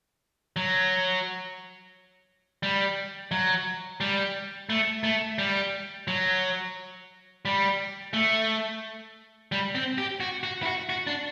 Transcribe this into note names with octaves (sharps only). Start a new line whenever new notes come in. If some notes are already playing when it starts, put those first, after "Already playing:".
F#3
G3
F#3
G3
A3
A3
G3
F#3
G3
A3
G3
C4
G4
F#4
F#4
E4
F#4
F#4
D4